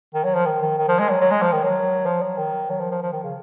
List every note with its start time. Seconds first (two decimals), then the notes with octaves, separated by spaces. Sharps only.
0.14 D#3
0.24 F#3
0.35 F3
0.46 D#3
0.62 D#3
0.78 D#3
0.88 F3
0.99 G#3
1.10 F#3
1.21 F#3
1.31 G#3
1.42 F3
1.52 D#3
1.63 F#3
2.06 F3
2.22 F#3
2.38 D#3
2.70 F#3
2.80 F3
2.91 F3
3.02 F3
3.13 D#3
3.24 C#3